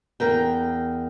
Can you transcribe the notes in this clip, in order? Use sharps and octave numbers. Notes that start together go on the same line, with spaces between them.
E2 A#4 G5